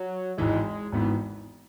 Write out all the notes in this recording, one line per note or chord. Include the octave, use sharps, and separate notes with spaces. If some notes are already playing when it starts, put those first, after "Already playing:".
Already playing: F#3
G#1 G#2 E3 G#3
G#1 G#2 E3 B3